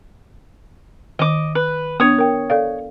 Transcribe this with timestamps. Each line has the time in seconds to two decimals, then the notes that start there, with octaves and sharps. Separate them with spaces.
1.19 D#3 D#5 D6
1.55 B4
2.00 B3 D4 C#5 D#6
2.18 A#4 G5
2.50 A4 D5 F5